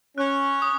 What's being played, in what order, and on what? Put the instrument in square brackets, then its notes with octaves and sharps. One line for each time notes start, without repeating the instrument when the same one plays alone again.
[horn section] C#4 [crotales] F#6
[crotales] D#6